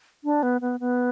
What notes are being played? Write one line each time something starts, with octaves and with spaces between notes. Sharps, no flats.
D4
B3
B3
B3